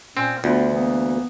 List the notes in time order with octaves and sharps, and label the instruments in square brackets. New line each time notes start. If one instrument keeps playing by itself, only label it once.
[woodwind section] A#2 C#4 [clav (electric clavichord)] C4
[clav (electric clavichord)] D2 [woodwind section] B3 F4
[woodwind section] E3 A#3 B3